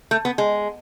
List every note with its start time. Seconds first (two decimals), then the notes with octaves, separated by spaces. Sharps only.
0.11 A3
0.25 B3
0.38 G#3